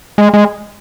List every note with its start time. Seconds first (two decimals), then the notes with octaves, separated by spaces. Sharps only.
0.18 G#3
0.34 G#3